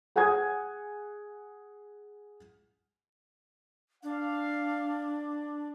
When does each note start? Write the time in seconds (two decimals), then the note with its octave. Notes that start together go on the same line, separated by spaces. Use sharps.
0.16 G#4 F#5 G#5 D#6 G#6
4.03 D4 F5